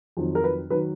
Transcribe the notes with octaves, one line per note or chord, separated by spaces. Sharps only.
F2 D#3 F#3
A#4
B4
D#3 F#3 B4